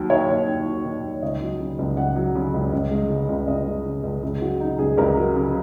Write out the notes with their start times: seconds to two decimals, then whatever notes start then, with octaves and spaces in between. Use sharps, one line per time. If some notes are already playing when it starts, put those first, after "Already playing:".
Already playing: D#2 F#3
0.10 D#3 C#5
0.28 D#2
0.48 D#2
0.66 F#3
0.85 D#3
1.03 D#2
1.22 C#2 D#5
1.41 F#3
1.60 C#3
1.79 C#2
1.97 C#2 F#5
2.16 F#3
2.35 C#3
2.54 C#2
2.72 C#2
2.91 G#3
3.10 C#3
3.29 C#2
3.48 C#2 D#5
3.66 G#3
3.85 C#3
4.03 C#2
4.23 C#2 G#4
4.41 F#3 F#4
4.60 C#3 D#4
4.79 C#2 G#4
4.97 C#2 A#4
5.17 F#3
5.35 C#3